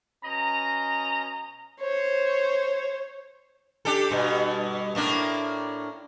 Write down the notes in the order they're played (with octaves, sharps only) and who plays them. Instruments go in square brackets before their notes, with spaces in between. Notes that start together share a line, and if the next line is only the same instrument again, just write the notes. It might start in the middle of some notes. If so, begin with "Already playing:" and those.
[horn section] B2 C#4 D#5 A#5
[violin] C5 C#5
[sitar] D4 G4 A4
G2 B2
A2 A#3 D4